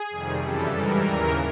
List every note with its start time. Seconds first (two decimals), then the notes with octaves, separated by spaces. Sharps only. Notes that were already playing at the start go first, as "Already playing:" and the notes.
Already playing: G#4
0.10 F2 C3 D#3 G3
0.42 F#2 C#3 E3 G3 A4
0.74 G#2 E3 G3 A#4
1.07 D#2 C#3 E3